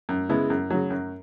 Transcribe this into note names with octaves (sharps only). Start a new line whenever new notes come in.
F#2
C#3 G#3 B3 E4
F#2
C#3 F#3
F#2